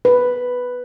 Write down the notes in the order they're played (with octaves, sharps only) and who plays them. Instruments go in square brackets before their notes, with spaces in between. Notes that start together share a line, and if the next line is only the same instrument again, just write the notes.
[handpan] B4